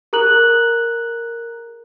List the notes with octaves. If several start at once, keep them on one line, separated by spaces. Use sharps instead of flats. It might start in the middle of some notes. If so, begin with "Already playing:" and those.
G#4 A#4 A#5 F#6 F#7